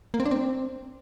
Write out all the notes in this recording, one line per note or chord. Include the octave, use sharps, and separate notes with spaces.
A#3
C4
D4
C4